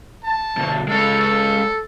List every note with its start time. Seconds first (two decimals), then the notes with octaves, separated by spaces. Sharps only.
0.24 A5
0.57 D2 B2
0.88 G#3 C#4 A4
1.21 A4